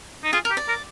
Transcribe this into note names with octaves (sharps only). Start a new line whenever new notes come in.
D#4
F4 G#4
A#4
G4
D5
A#4